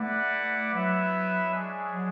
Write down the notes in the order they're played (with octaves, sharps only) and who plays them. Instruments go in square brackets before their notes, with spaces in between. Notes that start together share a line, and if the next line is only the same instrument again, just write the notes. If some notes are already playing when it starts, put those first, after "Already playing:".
Already playing: [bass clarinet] A3 [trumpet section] E4 B4 D5 F#5
[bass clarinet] F#3 [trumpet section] B3 E4 B4 E5
[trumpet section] G#3 D4 G#4 C#5
[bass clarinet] F#3